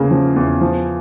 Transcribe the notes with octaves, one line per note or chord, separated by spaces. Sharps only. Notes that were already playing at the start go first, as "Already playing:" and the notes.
Already playing: E2 C#3 A#3
F3
E2
F3